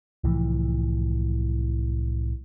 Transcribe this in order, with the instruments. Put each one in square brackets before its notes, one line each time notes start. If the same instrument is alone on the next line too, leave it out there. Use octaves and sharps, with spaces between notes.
[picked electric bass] C2 A2 E3 F3